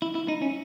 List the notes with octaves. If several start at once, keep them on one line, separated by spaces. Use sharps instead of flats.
E4
E4
D#4
C#4